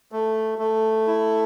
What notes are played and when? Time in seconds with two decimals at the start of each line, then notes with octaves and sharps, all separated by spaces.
0.12 A3
0.58 A3
1.07 E4